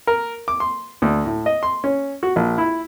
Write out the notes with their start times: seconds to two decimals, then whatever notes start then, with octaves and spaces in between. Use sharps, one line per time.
0.07 A#4
0.48 D6
0.60 C6
1.02 D2
1.26 A2
1.46 D#5
1.63 C6
1.84 C#4
2.23 F#4
2.36 A#1
2.58 E4